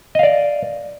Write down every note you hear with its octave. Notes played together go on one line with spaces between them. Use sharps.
D5 D#5 F5